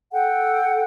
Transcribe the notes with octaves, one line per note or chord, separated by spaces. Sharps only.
A4 F#5 G5